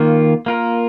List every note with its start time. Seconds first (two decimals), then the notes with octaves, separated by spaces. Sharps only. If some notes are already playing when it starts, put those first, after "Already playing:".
Already playing: D#3 A#3 F4
0.46 A#3 F4 A#4